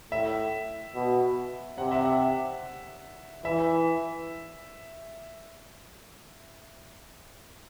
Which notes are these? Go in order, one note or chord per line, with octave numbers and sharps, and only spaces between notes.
A2 E5
B2
C3 F#5
E5
F#5
E3 E5